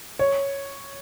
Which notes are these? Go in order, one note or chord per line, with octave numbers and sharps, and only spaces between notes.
C#5